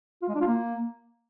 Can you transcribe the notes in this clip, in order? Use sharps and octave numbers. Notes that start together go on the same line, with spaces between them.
F4
G#3
D4
F4
A#3